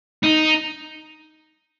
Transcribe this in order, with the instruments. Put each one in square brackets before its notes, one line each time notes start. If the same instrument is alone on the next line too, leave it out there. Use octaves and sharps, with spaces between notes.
[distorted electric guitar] D#4